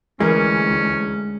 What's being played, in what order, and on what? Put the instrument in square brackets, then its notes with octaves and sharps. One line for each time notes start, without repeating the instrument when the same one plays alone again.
[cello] D2 [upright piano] E3 A#4 [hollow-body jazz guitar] G#3 [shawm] C#4